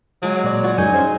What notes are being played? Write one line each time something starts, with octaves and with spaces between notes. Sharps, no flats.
F#3 G#3
A#2 D5
F#4
F#2 G#3 D#4 G#5
C#4 G#4 C5